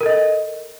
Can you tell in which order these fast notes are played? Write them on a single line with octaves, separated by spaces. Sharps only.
A#4 A4 D#5